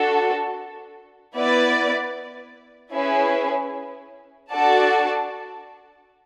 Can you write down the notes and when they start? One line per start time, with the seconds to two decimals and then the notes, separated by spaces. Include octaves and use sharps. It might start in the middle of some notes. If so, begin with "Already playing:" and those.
Already playing: D4 F#4 A4
1.35 B3 E4 B4 D5
2.93 C#4 E4 G#4 B4
4.51 D4 F#4 A4 D5 A5